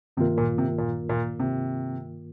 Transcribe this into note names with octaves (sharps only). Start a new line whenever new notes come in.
G2 C3 D#3 A#3 F4 A#4
A#2
C3
A#2
A#2
C3